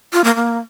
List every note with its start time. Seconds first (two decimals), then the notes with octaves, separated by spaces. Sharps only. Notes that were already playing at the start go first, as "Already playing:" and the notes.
0.13 F4
0.24 A#3
0.35 A#3